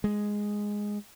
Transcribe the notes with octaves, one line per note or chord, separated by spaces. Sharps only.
G#3